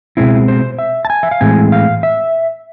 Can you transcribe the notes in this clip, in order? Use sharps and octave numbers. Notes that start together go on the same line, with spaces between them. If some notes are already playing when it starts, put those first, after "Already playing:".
B2 G#3 C4 E4
C5
E5
A5
G#5
E5
F5
A2 E3 G#3 C4 G#5
F5
E5